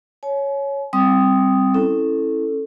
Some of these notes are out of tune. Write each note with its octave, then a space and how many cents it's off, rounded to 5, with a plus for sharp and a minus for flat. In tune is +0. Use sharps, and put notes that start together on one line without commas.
C#5 +0 G#5 +40
G3 +0 C4 +0 D#6 +0
C#4 -25 E4 +0 A4 +0